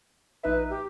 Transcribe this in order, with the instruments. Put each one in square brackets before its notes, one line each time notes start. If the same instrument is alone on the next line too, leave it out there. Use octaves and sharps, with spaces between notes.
[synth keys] A#1 D#4 E5 [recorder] B4
[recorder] G4